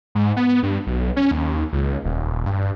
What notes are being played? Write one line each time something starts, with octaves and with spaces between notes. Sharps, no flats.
G#2
B3
G2
B1
C#4
D#2
C#2
D#1
G2